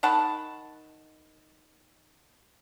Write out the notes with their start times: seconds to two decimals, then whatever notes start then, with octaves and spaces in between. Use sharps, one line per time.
0.03 D#3 F#5 A5 B5